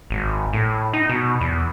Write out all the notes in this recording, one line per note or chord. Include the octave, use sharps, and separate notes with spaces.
G#1
A2
D#4
B2
E2